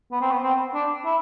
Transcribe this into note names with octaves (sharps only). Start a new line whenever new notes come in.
B3
C4
B3
C4
D4
E4